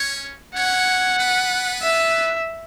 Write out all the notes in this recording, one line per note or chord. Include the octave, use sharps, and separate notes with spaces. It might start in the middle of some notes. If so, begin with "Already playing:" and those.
Already playing: C#4 C#5
C#4 C#5 F#5
B3 B4
E5